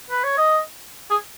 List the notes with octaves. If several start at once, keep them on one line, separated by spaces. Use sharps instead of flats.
B4
C#5
D#5
G#4